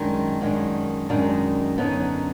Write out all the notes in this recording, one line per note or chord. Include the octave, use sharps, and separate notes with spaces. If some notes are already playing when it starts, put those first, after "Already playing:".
Already playing: F#2 D#3 G#3 D4
F#2 D#3 G#3 D4
F#2 D#3 G#3 D4
F#2 D3 F#3 B3 D#4